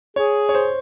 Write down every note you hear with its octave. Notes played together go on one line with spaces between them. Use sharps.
G#4 C#5
C#5
C5